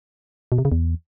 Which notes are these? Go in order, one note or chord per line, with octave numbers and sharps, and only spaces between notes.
B2
C3
C#3
E2